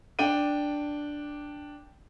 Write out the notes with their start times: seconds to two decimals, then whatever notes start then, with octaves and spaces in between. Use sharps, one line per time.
0.19 D4 G5 D#7